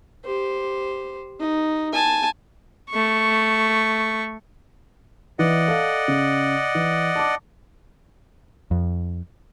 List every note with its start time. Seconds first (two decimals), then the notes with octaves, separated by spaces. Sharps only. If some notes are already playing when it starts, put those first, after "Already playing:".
0.25 G4 C5
1.40 D#4
1.93 G#5 A5
2.90 A3 C#6
5.39 E3 D5 D#5 F#5
5.68 A4 F5
6.08 C#3
6.75 E3
7.16 A5 D6
8.71 F2